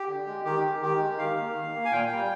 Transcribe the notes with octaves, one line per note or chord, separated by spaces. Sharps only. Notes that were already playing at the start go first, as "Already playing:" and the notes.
Already playing: G4
D3
G#3
D#3 G4
G#3
D#3 G4
G#3
D#3 F5
A#3
D#3
A#3
G#5
A#2 G5
G3 A#3